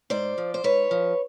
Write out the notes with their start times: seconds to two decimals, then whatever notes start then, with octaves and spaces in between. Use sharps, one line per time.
0.10 G#2 C5 D5
0.38 F3
0.54 C5
0.64 G#2 B4 C#5
0.91 F3